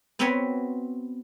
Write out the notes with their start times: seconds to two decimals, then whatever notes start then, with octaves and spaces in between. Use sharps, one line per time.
0.19 B3 C4 F#4 A#4 B4 C#5